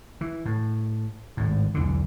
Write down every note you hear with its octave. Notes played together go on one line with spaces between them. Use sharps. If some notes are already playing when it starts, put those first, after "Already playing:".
E3
A2
G#1 A2
B1 E2 D3